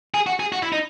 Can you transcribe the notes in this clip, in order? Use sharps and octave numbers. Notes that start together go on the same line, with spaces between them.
G#4
F#4
G#4
F#4
E4
D#4